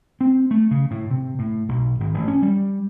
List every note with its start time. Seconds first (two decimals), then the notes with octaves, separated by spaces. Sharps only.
0.21 C4
0.51 A3
0.71 C#3
0.91 A2
1.11 C3
1.39 A2
1.69 B1
2.00 G#1
2.14 A1
2.28 C#4
2.42 G3